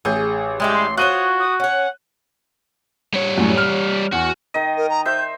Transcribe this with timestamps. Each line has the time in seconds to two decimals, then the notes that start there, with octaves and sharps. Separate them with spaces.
0.05 A1 G#4 G6
0.60 G3 G#3 E4 G4
0.74 C6
0.97 F4 F#4 C5 C#5 D#6 F#6 D#7 G7
1.39 D#6
1.60 C#4 C#5 F#5
3.14 G3 C#5
3.38 F#2 A2
3.57 F6
4.12 E2 F#4
4.54 D#3 D#5
4.77 A#4
4.89 A#5
5.06 C5 E5 G6